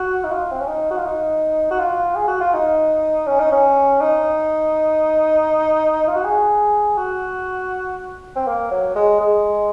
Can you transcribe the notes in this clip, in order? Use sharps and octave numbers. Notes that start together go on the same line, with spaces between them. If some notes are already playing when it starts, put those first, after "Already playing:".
Already playing: F#4
D#4
F4
C4
C#4
D#4
F#4
F4
D#4
F#4
F4
G#4
F#4
F4
D#4
C#4
D#4
C#4
D#4
F4
F#4
G#4
F#4
C4
A#3
F#3
G#3
G#3